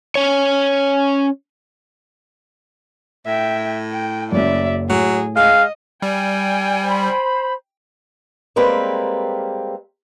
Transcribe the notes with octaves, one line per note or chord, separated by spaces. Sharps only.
C#4 C#5
A2 E5 G5
G5
F#1 F#2 D5 E5
A2 F#3 G#4
G#3 D#5 F5
G3 G5 G#5
C5 B5
G3 G#3 A#3 C4 A#4 B4